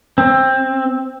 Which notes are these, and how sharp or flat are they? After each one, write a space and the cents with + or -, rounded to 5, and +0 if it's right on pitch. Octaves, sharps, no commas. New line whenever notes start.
C4 +15